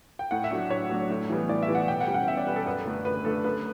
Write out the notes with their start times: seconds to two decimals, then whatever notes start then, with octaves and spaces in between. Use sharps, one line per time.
0.19 G5
0.31 A2 F#5
0.44 E5
0.51 F#3 A3 D4
0.70 A2 C#5
0.90 F#3 A3 D4
1.10 A2
1.29 E3 G3 B3
1.49 A2 D5
1.63 E5
1.68 E3 G3 B3
1.75 F#5
1.88 B2 G5
2.01 F#5
2.08 G3 C#4
2.14 F#5
2.27 B2 E5
2.37 D5
2.46 G3 C#4 B4
2.56 A4
2.66 F#2 B4
2.86 D3 A3 D4
3.05 F#2 B4
3.25 D3 A3 D4 A4
3.44 F#2 B4